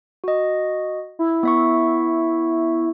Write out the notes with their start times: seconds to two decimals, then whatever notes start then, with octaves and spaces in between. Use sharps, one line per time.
0.24 F#4 D#5
1.19 E4
1.43 B3 E5 C#6